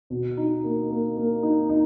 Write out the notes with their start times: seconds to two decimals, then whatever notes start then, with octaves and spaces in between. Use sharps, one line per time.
0.10 B2
0.37 D#4
0.64 A#3
0.90 A#3
1.17 A#3
1.43 D#4
1.69 D#4